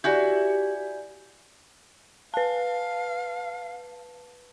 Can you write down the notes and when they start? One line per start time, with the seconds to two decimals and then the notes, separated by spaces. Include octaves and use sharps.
0.04 E4 F#4 G4 D5 G#5 G6
2.34 B4 F5 A5